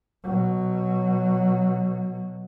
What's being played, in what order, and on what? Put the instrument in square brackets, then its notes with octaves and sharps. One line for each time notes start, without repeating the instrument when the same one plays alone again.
[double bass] B2 F#3